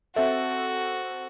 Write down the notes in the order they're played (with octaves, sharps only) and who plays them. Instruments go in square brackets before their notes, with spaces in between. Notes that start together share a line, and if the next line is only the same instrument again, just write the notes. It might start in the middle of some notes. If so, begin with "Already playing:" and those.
[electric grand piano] C4 A4 [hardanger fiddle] F#4 [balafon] E5